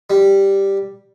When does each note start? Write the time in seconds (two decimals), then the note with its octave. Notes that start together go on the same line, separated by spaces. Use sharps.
0.10 G3